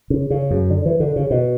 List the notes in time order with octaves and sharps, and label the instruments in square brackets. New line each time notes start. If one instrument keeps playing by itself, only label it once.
[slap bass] C#3
C#3
F#2
D3
E3
D3
C#3
B2